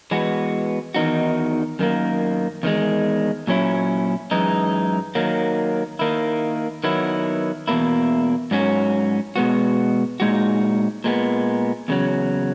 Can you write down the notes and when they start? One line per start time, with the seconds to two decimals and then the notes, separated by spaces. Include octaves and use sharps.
0.11 E3 G#3 B3 F#4
0.95 E2 D#3 A#3 D#4 F#4
1.79 F#2 D#3 A#3
2.63 E2 D#3 G#3
3.47 A#2 F#3 C#4 E4
4.31 F#2 E3 G#3 D#4
5.15 D#3 F#3 A#3
5.99 D#3 A#3 E4
6.84 D#3 F#3 B3 E4
7.68 E2 B2 A#3 E4
8.51 G#2 F#3 C#4 F#4
9.36 B2 G#3 B3 F#4
10.20 A#2 G#3 D#4 F#4
11.04 A#2 G#3 B3
11.88 E2 C#3 F#3